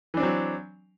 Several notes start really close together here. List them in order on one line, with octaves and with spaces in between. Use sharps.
E3 D4 C4 F#3